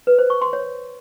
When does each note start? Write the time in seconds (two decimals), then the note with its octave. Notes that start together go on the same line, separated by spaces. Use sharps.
0.07 B4
0.19 C5
0.30 C#6
0.41 C6
0.53 C#5